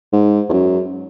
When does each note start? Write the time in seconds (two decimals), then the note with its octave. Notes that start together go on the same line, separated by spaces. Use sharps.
0.13 G#2
0.49 E2
0.53 F#2